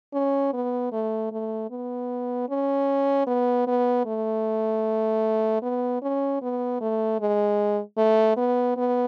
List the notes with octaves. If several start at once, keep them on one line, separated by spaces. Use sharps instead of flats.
C#4
B3
A3
A3
B3
C#4
B3
B3
A3
B3
C#4
B3
A3
G#3
A3
B3
B3